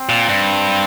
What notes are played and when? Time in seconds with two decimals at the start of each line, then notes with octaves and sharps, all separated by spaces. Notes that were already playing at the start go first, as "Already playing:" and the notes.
Already playing: C4
0.09 A#2
0.29 G2